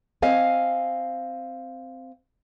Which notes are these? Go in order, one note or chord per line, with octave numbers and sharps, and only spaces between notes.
C4 D#5 F5 G#5